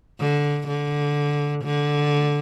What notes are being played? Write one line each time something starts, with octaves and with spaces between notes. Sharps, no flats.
D3
D3
D3